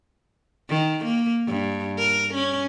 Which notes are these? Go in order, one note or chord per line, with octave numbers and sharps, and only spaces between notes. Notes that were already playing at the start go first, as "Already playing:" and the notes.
D#3
A#3
G2
A#4
C#4